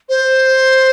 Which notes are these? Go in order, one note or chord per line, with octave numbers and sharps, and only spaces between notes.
C5